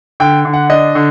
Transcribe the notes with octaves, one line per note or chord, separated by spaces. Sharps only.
D3 G5
D3
F#5
D4 D#5
D3